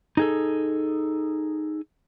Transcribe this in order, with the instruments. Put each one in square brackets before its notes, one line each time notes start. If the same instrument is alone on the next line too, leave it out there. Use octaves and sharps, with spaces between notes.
[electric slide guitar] D#4 G#4 A4